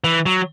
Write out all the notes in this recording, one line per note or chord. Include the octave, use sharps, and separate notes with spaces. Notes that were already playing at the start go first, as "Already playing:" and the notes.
E3
F#3